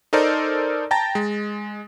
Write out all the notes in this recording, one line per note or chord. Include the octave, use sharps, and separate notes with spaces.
D#4 A4 A#4 C5 D5
G5 A5 A#5 A6 A#6
G#3